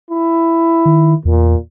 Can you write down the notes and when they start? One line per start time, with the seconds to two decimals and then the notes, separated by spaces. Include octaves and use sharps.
0.11 E4
0.85 D#3
1.25 E2 A#2